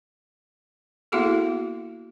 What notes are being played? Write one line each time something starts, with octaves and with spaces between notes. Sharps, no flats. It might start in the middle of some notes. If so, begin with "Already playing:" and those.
A#3 B3 E4 F#4 G#4 A4